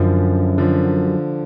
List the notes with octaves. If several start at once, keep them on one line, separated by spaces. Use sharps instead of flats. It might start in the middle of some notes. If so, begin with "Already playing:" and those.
Already playing: F#2 D3 F3
D3 F3